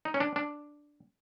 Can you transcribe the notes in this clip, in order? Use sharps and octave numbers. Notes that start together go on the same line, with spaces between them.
D#4
C#4
D4
D4